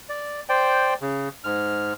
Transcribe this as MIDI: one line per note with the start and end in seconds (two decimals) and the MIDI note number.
0.09 0.41 74
0.49 0.94 72
0.49 0.94 74
0.49 0.94 79
1.01 1.29 49
1.44 1.93 44
1.44 1.93 89